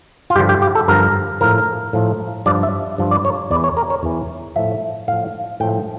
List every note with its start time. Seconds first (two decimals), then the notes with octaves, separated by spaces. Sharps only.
0.30 F4
0.35 G2 D3 F3 G4
0.49 G4
0.62 G4
0.75 A4
0.88 G2 D3 F3 A#4
1.41 A2 F3 A#4
1.93 A2 F3
2.46 G2 F3 D5
2.63 E5
2.98 G2 F3
3.11 D5
3.25 C#5
3.51 E2 D5
3.54 E3
3.64 C#5
3.77 A#4
3.90 C#5
4.03 E2 E3
4.56 A2 F3 E5
5.08 A2 F3 F5
5.60 A2 F3 G5